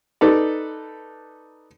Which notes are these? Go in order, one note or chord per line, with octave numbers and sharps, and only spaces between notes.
D#4 A4 B4 D5